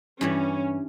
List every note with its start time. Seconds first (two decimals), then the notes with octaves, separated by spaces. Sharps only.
0.21 G2 E3 G3 C#4